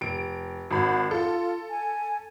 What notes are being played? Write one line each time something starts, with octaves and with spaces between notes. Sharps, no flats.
F1 D7
G#1 F#4 B5
F4 A4
G#5